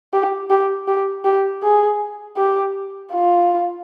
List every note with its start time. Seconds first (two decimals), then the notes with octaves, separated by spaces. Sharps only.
0.13 G4
0.50 G4
0.88 G4
1.25 G4
1.63 G#4
2.37 G4
3.12 F4